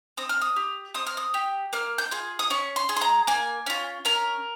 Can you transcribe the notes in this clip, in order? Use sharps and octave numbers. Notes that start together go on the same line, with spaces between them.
C4 D#6
F6
D#6
G4
C4 D#6
F6
D#6
G4
A#3 F6
G6
F4 G#4
D#6
C#4 C#6
C6
G#4
C6
A#5
A#3 G#5
C#4 F4
C#4 A#4